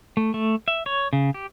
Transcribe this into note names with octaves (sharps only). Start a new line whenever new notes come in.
A3
A3
E5
C#5
C#3
G4